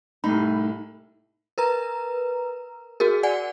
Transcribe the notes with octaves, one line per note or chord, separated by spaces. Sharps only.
C2 A2 D#4 B5
A#4 B4 A#5
F#4 G#4 A#4
D5 F#5 G#5